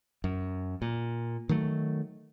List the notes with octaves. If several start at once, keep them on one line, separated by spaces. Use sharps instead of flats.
F#2
A#2
D#3 F#3 A3